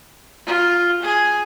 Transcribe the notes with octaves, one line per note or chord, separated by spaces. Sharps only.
F4
G#4